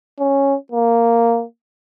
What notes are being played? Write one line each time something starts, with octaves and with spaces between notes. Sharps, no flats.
C#4
A#3